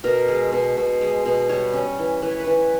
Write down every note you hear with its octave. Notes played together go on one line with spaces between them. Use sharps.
B2 A#4
G#3
B2
B2
G#3
B2
G3 C#5
C#4
E3
E3 B4
C#5
B4
E3